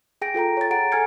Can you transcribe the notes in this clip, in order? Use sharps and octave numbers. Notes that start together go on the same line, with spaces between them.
G#4 G5 A#6 D7
F4 A4 G5 A#5
C#5 A6
G#4 F#5 A#5 D7
A4 G#5 F6 G#6 C#7